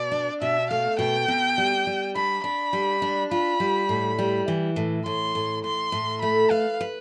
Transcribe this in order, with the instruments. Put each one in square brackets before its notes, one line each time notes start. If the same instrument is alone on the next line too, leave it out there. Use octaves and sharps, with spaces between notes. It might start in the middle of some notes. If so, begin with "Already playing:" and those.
Already playing: [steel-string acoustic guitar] B2 [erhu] D5
[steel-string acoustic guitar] D4
[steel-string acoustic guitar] B2 [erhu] E5
[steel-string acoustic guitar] A3 [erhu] F5
[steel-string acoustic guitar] B2 [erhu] G5
[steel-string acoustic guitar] B2
G3
G3
[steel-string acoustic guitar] D4 [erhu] B5
[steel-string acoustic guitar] D4 [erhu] B5
[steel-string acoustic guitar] G3
D4
[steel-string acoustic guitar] F4 [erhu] B5
[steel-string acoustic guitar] G3
A2
G3
E3
A2
[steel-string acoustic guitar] A2 [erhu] C6
[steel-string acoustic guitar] A2
[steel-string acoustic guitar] A2 [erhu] C6
[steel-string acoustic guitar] A2
[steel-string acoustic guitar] A3 [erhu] B5
[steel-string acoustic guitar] B4 [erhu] F5
[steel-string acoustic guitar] B4